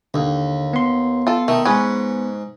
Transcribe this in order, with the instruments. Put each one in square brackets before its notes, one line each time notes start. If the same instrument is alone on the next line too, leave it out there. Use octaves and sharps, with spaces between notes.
[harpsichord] D#2 [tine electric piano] D3
[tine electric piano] B3 C6
[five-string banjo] F4 A4
[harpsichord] D#3 [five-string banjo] A3
[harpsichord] G#2 [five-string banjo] C#4 B4